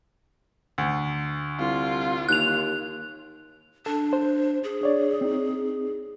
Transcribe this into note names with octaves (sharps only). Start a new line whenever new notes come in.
D2
C2 F4
D#2 F#6 F7
D4 A4 A5
C5
G#4
D4 C#5 D5
C4 D#4